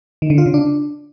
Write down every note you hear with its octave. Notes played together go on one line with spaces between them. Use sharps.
D#3
D3
F4
C#3
D4